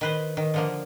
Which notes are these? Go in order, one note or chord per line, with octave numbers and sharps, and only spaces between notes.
D#3 B4 C5
D#3
D3 F3 A#3